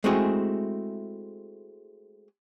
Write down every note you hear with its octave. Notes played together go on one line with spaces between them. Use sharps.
G#3 A3 C4 E4 F#4 G#4